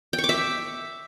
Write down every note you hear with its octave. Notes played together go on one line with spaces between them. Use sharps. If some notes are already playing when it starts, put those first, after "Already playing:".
G5
C#6
D6
E5